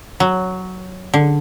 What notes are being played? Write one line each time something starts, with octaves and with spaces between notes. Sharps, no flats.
F#3
D3